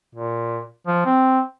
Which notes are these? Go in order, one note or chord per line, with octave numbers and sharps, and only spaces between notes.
A#2
F3
C4